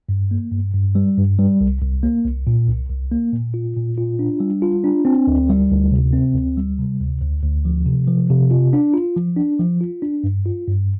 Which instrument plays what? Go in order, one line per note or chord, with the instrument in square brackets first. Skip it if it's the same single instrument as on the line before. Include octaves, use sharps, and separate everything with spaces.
[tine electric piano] G2
A#3
G2
G2
G3
G2
G3
C2
C2
A#3
C2
A#2
C2
C2
A#3
A#2
F4
A#2
F4
D4
G3
F4
D4
C4
D2
G3
D2
C3
C4
D2
G3
C3
D2
D2
D2
F3
C3
F3
C3
F4
D4
F4
F3
D4
F3
F4
D4
G2
F4
G2